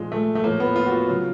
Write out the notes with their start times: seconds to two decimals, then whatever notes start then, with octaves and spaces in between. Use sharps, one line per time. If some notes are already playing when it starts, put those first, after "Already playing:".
Already playing: A#2 F3 G#3
0.12 A3
0.35 A3
0.44 A2 F3 A#3
0.60 B3
0.76 F4
0.86 F#4
0.92 F4
1.08 C#3 F#3